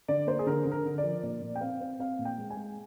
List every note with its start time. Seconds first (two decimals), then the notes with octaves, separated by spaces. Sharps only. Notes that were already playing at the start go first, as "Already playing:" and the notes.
0.08 D3 D5
0.27 A#3 C5
0.39 G#4
0.47 D3 A#4
0.65 D3
0.72 A#4
0.85 D3
0.98 D5
1.04 F3
1.23 A#2 D5
1.42 A#2
1.55 G5
1.61 C4 F5
1.81 C4
1.99 C4 F5
2.19 A#2
2.25 G5
2.38 G#3
2.50 G#5
2.57 G#3